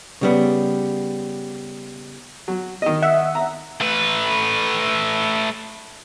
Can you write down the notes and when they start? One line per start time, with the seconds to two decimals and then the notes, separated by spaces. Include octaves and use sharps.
0.21 C#3 G3 B3
2.48 F#3
2.82 D#3 D#5
3.02 E5 F#5
3.35 A#5
3.81 A3 B4